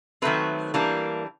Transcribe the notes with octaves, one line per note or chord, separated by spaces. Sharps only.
D#3 F#3 A3 C4 B4
E3 G3 A#3 D4